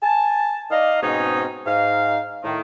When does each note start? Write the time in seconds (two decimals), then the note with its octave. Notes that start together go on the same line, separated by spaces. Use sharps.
0.02 G#5 A5
0.71 D#4 D5 D#5 F5
1.02 G#2 B2 G#3 C4 C#4 D#4
1.66 G#2 D#4 F5
2.43 A2 D#3